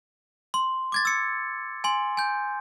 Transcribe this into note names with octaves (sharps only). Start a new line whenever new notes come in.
C6
D6 G#6 A6
E6 C#7
G#5 C6
G#5 G6